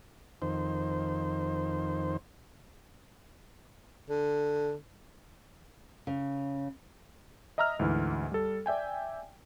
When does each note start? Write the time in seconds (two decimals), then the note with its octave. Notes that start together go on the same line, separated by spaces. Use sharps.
0.42 F2 D#3 C5
4.09 D3
6.07 C#3
7.58 D#5 E5 A#5 E6 F6
7.79 D2 G#2 E3
8.32 G3 A4
8.66 D5 E5 G5 G#5